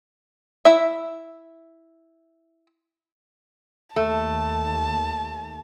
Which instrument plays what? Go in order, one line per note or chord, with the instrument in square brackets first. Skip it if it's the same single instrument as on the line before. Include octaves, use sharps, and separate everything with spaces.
[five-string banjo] E4 E5
[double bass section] D#2 [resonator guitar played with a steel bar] A3 [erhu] A5